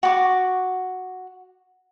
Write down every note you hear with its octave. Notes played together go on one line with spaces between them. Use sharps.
F#4 D6